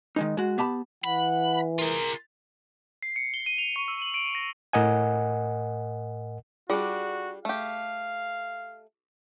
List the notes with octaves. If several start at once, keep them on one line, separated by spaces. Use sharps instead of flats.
D#3 G#3 D#4
G#3 F#4
B3 G4 A5 B5
E3 F#5 B5
F4 G#4 A#4
C7
C#7
G7
D#7
F7
C#6
E6
F#7
D7
A#6
A2 A#4 D#5 F#5 G#5
G3 D4 F4 F#4 G#4
A3 G4 F5